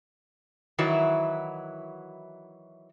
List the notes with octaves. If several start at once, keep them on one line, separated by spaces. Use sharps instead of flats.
D#3 E3 F#3 E4 F#4